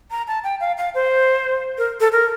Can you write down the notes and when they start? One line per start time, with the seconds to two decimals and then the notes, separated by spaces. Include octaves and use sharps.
0.11 A#5
0.28 A5
0.44 G5
0.60 F5
0.78 F5
0.95 C5
1.78 A#4
2.00 A4
2.12 A#4